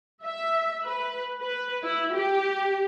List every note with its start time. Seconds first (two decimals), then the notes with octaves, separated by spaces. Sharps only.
0.24 E5
0.83 B4
1.40 B4
1.83 E4
2.14 G4